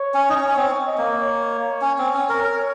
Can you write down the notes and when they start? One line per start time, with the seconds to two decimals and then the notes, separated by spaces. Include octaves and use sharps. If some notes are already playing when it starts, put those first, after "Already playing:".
Already playing: C#5
0.14 C#4
0.29 D#4
0.35 C#4
0.48 C#4
0.56 C4 C#5
0.87 D#5
0.98 A#3
1.19 C#5
1.82 C#4
1.98 C4
2.14 C#4
2.29 A#4
2.44 A#4